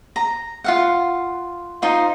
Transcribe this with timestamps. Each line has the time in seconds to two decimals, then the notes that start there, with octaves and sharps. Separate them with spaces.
0.16 A#5
0.64 F4 F5 F#5
1.82 D#4 F4 C5